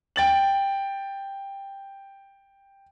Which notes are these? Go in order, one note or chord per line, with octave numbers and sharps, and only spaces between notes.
G5 A6 F#7